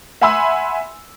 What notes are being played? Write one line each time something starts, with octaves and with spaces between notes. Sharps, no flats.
E5 F#5 G#5 B5 C6 E6